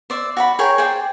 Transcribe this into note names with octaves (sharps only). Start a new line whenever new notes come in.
C5 D5 E5
F#4 D5 B5
G#4 A#4 C#5 G5
G#4 C5 D5 G5